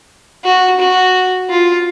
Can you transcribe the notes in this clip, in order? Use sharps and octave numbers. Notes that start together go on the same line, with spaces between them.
F#4
F#4
F4